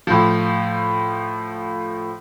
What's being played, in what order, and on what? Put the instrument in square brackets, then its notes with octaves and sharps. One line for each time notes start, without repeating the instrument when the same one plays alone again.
[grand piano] A2 F3